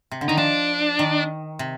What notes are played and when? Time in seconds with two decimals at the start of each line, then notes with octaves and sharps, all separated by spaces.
0.11 C3
0.21 D3
0.28 D#3 D#4
0.37 F3 D4
0.99 D#3
1.59 C3